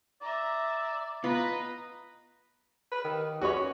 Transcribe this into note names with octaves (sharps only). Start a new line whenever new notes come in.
D5 E5 A#5
B3 F4 B4 D#5 A#5
B4
D#3
C#4 F#4 B4 C#5